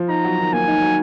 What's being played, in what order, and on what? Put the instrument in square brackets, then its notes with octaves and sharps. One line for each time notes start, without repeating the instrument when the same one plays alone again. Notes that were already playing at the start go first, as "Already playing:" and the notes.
Already playing: [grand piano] F3
[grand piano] D#4 [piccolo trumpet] A#5
[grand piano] F#3
D#3
[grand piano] A#3 [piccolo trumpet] G#5
[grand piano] D#4
F#3